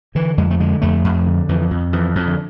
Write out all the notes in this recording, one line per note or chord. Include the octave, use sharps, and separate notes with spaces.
D3 E3
F2 G#3
A3
D3 G#3
F2 A3
F2
D3
F2 E3
F2
F2 E3
F2
D3